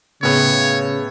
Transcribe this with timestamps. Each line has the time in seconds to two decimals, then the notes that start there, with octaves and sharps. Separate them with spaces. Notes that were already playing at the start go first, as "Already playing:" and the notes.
0.23 A2 C#3 B3 C#5